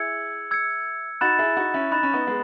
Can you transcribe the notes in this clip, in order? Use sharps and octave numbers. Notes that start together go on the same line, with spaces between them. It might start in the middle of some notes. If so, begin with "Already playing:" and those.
Already playing: E4 G#4 E6 G#6 C#7
E6 G#6 C#7
D#4 F#4 B5 F#6 A6 E7
E4 G#4
D#4 F#4
C#4 E4
D#4 B5 F#6 A6 E7
C#4
B3 D#4
G#3 B3